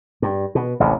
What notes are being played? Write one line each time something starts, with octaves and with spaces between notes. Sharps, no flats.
G2
B2
A1 D#2 C3